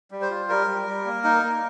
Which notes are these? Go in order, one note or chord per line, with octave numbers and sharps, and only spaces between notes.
G3
C5
F4
G3 A#4
G3
G3
A#3
D#4
A#3